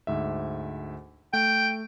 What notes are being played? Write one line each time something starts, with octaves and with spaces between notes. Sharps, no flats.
D2 G#2 E5
A3 G5